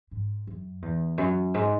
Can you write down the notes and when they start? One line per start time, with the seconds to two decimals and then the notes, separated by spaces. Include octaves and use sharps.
0.11 G#2
0.47 F#2
0.82 E2
1.18 F#2
1.54 G#2